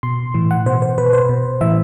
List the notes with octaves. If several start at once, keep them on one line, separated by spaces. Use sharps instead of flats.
B2 C6
A2 E3
F#5
B2 C5
C5
B2 B4
C5
B2
A2 E3 E5